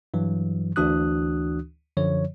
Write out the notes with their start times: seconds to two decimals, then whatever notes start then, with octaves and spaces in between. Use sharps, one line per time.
0.14 G2 E3 F#3
0.76 D2 E3 D4 F#4 D#6 F#6
1.97 F#2 D3 F3 C#5